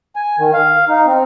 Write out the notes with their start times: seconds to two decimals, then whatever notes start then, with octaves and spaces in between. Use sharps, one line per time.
0.16 G#5
0.39 D#3
0.54 F5
0.89 D#4
1.06 C4